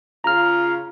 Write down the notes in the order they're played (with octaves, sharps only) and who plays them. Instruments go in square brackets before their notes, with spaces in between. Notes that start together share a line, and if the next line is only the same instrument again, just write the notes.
[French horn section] C#3 F4 [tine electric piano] A#5 F6